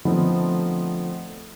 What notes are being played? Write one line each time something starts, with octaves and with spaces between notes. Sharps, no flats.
D3 F3 A3 B3 C4 D#4